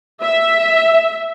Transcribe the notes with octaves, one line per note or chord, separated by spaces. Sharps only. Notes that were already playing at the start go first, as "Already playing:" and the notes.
E5